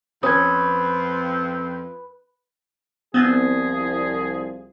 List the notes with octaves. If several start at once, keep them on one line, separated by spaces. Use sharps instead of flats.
F2 C4 C#4 B4 D#6 G#6
C2 F3 B3 C4 G#4